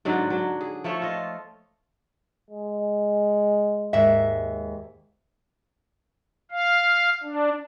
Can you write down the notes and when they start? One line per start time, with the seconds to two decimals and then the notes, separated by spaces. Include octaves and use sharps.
0.05 G#2 D3 F#3 D4
0.30 F#3 D4
0.61 G#4
0.84 F3 A3 A4 C#5
1.02 F4 D#5
2.51 G#3
3.93 D#2 G#2 E5
6.51 F5
7.23 D4